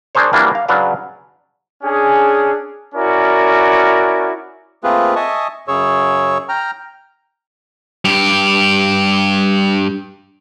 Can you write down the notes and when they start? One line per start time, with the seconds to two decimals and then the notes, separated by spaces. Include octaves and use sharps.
0.15 D4 G#4 A#4 C5 C#5
0.33 E3 F#3 G3 A#3 D4
0.55 F5
0.68 C#3 F#3 D4 B4 D5 F5
1.84 C#4 D4 G#4
2.95 C#4 E4 F#4 A#4 D5
4.84 A3 A#3 C4 F4 G#4 B4
5.16 D#5 E5 G#5 A5 C#6 D#6
5.68 F#2 C#3 G#4 C#5 C#6 E6
6.49 G5 A#5 F6
8.05 G2 G4